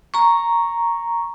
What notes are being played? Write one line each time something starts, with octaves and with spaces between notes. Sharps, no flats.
A#5 C#6